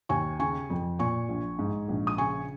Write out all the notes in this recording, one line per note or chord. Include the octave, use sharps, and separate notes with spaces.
D#2 G#5 C#6
C#3 G#5 C#6
F2
A#2 G#5 C#6
A#1
G#2
A#1
D#6
C#3 G#5 C#6